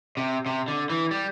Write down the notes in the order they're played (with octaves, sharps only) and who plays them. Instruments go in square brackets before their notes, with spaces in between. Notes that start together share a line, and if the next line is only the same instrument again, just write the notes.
[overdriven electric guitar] C3
C3
D3
E3
G3